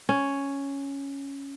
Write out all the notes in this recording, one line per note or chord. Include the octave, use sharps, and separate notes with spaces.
C#4